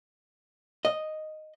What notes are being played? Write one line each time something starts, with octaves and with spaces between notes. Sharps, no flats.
D#5